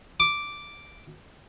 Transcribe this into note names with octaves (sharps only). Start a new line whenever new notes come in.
D6